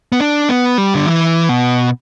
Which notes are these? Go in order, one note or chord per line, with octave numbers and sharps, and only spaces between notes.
B3
D4
B3
G3
D3
E3
B2